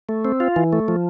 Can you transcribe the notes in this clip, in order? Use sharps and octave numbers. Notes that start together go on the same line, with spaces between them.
A3
C4
F4
E3
A3
F3